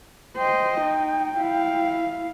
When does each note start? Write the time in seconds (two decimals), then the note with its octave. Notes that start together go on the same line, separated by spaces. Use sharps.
0.37 C5 D#5 G5
0.81 D#4
1.38 E4 F5